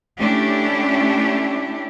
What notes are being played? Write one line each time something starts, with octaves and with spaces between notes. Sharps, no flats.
A3 C#4 D4 E4 G4